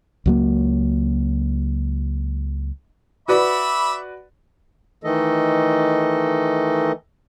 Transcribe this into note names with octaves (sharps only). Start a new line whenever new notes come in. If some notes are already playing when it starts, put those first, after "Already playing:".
C#2 F#3 A#3
F#4 B4 D5 E5 B5 D6
D#3 E3 A3 A4 D#5